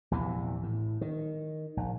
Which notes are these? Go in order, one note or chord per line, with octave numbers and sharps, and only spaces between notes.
A#1 E2 C3 E3
A2
D#3
A#1